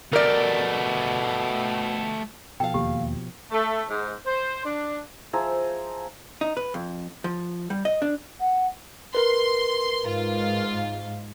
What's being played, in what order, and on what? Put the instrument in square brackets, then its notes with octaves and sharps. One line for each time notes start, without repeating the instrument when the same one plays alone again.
[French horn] B2 [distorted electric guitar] A3 G4 [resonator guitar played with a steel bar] A#4 D5
[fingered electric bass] B2 F3 [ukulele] A4 F5 [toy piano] G5
[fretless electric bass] E1 D#2 A#3 [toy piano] G4
[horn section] A3
G#2
C5
D4
[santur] F3 G#4 E5 A#5
[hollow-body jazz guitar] D#4
B4
F2
F3
G3
D#5
D4
[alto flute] F#5
[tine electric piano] A#4 B4 [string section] C6
[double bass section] G#2 [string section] F4